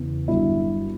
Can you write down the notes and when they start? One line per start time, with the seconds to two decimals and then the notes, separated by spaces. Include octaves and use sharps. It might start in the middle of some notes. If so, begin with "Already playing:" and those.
Already playing: E2 C#3 E3
0.28 G1 G2 D3 F#3 E4